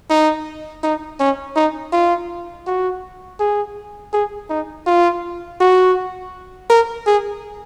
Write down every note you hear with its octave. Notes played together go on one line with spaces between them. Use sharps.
D#4
D#4
C#4
D#4
F4
F#4
G#4
G#4
D#4
F4
F#4
A#4
G#4